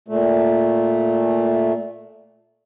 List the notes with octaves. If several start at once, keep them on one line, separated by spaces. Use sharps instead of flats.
A#2 A3